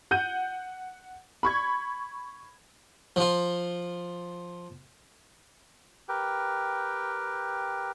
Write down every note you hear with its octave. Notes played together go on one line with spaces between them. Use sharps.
F#5 G6 D#7
B5 C#6 G#6
F3 F4
G4 A#4 B4 G5